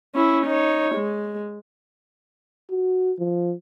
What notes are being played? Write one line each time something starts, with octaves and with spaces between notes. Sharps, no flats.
C#4 E4
D#4 C#5
G#3
F#4
F3